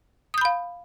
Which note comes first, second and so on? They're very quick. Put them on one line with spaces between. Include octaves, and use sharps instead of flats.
D#6 G6 B5 F5